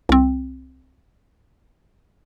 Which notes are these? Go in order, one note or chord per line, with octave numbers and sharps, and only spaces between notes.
C2 C4